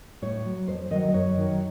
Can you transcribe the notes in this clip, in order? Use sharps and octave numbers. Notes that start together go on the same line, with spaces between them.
A2 C#5
F#3
F2 C5
D#3 F#3 D#5
D#5
F#2 C#5
D#3 F#3